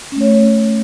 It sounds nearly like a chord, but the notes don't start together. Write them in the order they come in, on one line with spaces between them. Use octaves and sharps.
C#4 A3 C#5